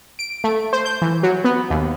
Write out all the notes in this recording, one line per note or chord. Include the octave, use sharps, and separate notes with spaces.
D7
A3
C5
G6
E3
F#3
B3
D#2